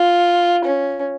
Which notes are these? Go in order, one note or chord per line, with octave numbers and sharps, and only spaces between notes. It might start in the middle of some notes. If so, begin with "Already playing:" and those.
Already playing: F4
C#4